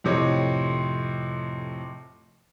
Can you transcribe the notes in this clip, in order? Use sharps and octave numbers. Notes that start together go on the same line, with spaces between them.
F2 A2 C3 C#5 D#5